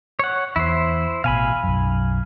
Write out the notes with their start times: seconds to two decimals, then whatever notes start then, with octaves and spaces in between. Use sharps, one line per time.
0.19 C#5 F#5
0.56 E2 E4 C5
1.24 A1 B2 F5 G#5 B5
1.64 B1 F#2